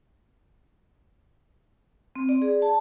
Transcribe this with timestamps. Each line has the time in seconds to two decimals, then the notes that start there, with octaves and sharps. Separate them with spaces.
2.16 C4
2.29 D5
2.42 G#4
2.62 A5